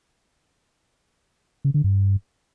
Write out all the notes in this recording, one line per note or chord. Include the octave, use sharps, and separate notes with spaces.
C#3
D3
G2